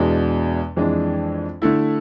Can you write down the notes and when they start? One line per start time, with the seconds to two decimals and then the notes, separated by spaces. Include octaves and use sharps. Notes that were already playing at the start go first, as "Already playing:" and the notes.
Already playing: E2 B2 G#3 D4
0.77 F2 E3 G#3 D4
1.62 D3 A3 E4